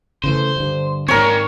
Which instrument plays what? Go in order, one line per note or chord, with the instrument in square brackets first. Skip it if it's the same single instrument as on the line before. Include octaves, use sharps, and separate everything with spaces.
[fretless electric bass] C#3 E3 A3 [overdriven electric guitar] C5
[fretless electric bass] G2 D3
[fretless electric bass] G#2 D#3 C4 [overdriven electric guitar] A#3 D4 [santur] A#4 C#5